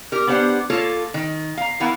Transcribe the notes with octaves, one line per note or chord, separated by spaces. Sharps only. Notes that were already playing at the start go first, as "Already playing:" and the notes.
G4 A#4
B3 D4 G4 C5 F#5
A#3 F4 A4 C#5
D#3
F5 A#5
E3 B3 E4 A#4 F5 F#5